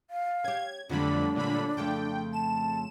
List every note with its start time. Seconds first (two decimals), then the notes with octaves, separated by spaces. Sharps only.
0.10 F5
0.44 C#4 G4 G#6
0.90 F2 D3 F#3 G3 A3 D4 B5
1.35 A#2 D3 B5
1.77 F2 C#3 A3 G5
2.33 A5 E7